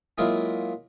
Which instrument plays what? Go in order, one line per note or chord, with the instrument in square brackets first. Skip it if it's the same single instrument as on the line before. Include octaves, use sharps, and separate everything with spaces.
[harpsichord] F#3 G#3 A#3 E4 F4 G#4